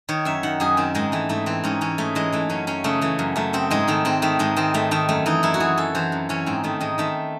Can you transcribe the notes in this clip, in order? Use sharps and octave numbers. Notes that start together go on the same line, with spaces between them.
D#3 C#5
F#2 E5
D#3 F#5
F#2 G#4
D#3 C4
G#2 G#3
E3 A3
G#2 A3
E3 C4
G#2 C#4
E3 C#4
G#2 A3
E3 G#3
E3 A3
F#2 C#4
F#2 C#4
C#3 A3
E3 A3
F#2
F#2 A3
C#3 C4
G#2 G#3
D#3 A3
G#2 C4
D#3 A3
G#2 G#3
D#3 C4
G#2 A3
D#3 A3
F#2 A3
E3 D#4
F#2 E4
F#4
E3 G#4
F#2 A4
E3 C5
F#2
E3 C#4
G#2 C4
D#3 A3
G#2 G#3
D#3 A3